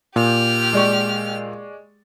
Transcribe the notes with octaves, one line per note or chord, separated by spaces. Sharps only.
A#2 G4 F6
G#3 D5 C#6